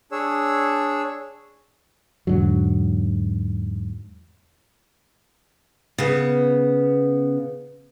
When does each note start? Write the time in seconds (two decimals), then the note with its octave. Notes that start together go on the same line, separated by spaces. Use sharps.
0.12 D4 G#4 C#5 E6
2.27 E2 G#2 D3 F#3
5.98 C#3 B3